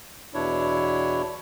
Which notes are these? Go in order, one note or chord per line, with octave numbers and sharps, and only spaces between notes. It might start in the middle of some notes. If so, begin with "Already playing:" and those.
E2 B2 D4 E4 C#5